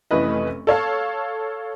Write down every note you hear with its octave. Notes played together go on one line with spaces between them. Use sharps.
F1 E3 A3 C#4 B4 D#5
A4 C#5 F5 A5